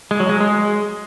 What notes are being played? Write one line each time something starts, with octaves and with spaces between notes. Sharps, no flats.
G#3
F#3
G#3
G#3